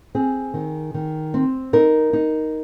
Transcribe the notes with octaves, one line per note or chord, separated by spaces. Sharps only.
C4 G#4
D#3
D#3
C4
D#4 A#4
D#4